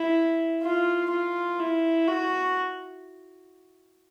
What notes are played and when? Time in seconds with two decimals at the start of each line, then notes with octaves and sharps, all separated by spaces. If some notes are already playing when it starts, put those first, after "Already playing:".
Already playing: E4
0.63 F4
1.10 F4
1.60 E4
2.08 F#4